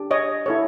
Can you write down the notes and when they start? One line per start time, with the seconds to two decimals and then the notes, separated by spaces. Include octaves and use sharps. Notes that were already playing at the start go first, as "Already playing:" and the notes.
Already playing: D4 G4
0.11 C#5 D#5
0.46 E4 A4 C#5